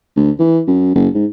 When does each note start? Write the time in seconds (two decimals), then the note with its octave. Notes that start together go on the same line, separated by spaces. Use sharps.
0.16 D2
0.39 E3
0.67 F#2
0.95 F#1
1.14 G#2